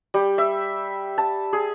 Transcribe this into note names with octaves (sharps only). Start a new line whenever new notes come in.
G3
E5
A5
G#4